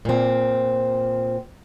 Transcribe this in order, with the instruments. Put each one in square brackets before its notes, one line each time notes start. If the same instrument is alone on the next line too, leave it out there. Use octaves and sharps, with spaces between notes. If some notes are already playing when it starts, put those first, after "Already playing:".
[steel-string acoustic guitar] A#2 C4